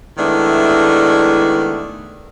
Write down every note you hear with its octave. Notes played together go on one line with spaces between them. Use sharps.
D#3 G#3 A3 B3 D4 E4